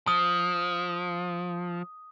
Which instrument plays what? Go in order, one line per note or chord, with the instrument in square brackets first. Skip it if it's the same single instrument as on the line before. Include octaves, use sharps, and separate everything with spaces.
[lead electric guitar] F3 [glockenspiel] D#6